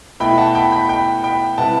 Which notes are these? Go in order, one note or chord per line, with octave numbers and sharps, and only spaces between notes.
B2 A3 E4 G5 B5
F#5 A5
G5 B5
G5 B5
G5 B5
G5 B5
C3 G3 B3 E4 F#5 A5